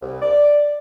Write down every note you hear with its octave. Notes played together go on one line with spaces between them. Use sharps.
C2
D5